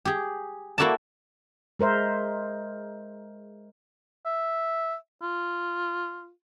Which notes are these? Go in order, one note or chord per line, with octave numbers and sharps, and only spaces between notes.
G4 G#4
A#3 E4 F#4 A4 D5 A5
G#3 A#4 C5 E5
E5
F4